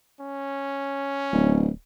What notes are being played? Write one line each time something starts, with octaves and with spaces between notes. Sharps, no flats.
C#4
D1